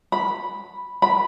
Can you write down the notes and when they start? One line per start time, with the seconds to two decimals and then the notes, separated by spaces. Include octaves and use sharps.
0.12 B5
1.02 B5